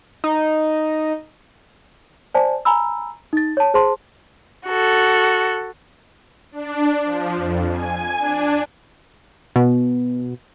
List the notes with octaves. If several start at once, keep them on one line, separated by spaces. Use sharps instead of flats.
D#4
C5 D5 G#5 A5
G#5 A#5 B5 E6
D#4 A6
C#5 A5
G#4 C5 A5 C6
F#4 A4
D4
F3
F2
G#5
D4
B2